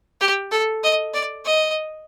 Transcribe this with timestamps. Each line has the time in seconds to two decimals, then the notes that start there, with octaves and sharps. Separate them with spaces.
0.21 G4
0.51 A4
0.84 D#5
1.14 D5
1.45 D#5